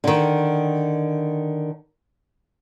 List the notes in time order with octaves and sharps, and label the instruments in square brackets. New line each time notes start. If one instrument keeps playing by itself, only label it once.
[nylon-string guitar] D3 D#3